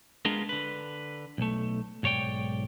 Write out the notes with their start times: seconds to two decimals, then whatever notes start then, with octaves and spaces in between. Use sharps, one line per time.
0.25 G#3 B3 D4 F4 G#4 A#4
0.49 D3 B4
1.38 B1 A3
2.03 B1 G#2 C#5 D5 G5